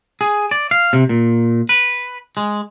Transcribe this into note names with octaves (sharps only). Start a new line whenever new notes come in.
G#4
D5
F5
C3
A#2
B4
G#3